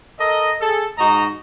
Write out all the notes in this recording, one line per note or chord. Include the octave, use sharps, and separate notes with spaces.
A4 A#4 D#5
G#4 A4
G#2 D#4 F#4 D#5 A#5